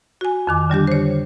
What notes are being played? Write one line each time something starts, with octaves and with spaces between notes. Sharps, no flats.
F#4 G#5
F2 D#3 D6
D3 G3 D4 G4
C5 C#5